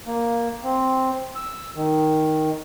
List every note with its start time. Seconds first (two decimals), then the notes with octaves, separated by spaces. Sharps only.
0.06 A#3
0.63 C4
1.36 E6
1.75 D#3